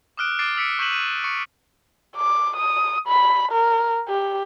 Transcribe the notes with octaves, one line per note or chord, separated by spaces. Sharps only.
D6 D#6 F6 F#6 D7
D6 A6 C7 D7
E6 B6 C#7 D7
C#6 G6 B6 D#7 E7 F#7
D#7
C#6 C#7
D6
D#6
B5
A#4
G4